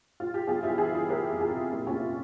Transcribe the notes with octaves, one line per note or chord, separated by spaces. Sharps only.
F4
G4
G1 F4 G#4
E3 E4 G4
F4 G#4
E3
E4 G4
E3 G4 A#4
F2
F4 G#4
C3
A#2 E4 G4
C#4 F4
A#2